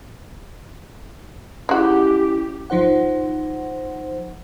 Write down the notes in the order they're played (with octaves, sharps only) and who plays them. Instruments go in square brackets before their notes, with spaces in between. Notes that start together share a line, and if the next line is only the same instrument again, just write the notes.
[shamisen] G#3 F#4 [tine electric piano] C#4 E4 [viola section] G4
[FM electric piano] G#1 F3 D#4 C5 F#5